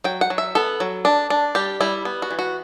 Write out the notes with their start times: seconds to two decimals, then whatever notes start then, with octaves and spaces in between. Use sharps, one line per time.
0.04 F#3 G5
0.21 F#5
0.30 F#3
0.38 E5
0.55 B3 A4
0.80 F#3
1.05 D4
1.30 D4
1.55 G3 G4
1.81 G3 E4
2.05 B3
2.22 F#4
2.31 E3
2.39 F#4